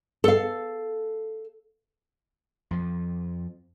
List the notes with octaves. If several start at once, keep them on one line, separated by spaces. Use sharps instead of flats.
A4 F5
F2 F3